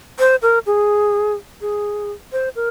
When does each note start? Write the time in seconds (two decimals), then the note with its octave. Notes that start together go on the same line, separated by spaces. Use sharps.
0.19 C5
0.42 A#4
0.66 G#4
1.61 G#4
2.32 C5
2.56 A#4